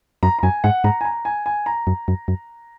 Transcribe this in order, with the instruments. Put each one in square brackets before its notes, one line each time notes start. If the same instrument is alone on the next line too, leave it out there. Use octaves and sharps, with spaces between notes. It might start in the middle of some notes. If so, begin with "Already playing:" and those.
[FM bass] F#2 [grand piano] A#5
[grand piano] A#5
[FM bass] F#2 [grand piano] G#5
[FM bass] G#2 [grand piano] F#5
[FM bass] G#2 [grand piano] A#5
[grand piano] G#5
A#5
G#5
G#5
A#5
[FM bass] F#2
F#2
F#2